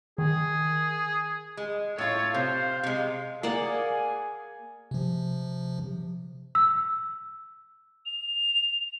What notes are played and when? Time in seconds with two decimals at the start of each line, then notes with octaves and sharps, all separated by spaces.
0.18 D#3 G#4
1.57 G#3
1.98 A2 F4 A4 C#5
2.34 C3 C5 F5
2.83 C3 G#3
3.43 A#3 G#4 D5 F#5 G#5
4.91 C3 F3
6.55 E6
8.06 F7